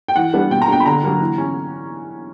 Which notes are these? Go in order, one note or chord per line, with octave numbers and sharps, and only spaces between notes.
G5
E3 F#5
G3 B3 D4
B2 G5
A#5
A#3 D4 G5
B5
D3 A#5
F#3 A#3 D4
E3
C#4